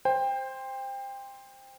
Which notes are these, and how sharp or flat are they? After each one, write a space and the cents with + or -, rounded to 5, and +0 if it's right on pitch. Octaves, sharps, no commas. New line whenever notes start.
C5 +0 G5 +25